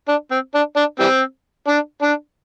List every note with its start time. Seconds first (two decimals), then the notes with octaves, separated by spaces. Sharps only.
0.08 D4
0.31 C4
0.55 D4
0.76 D4
1.00 E3 G3 C4
1.68 D4
2.02 D4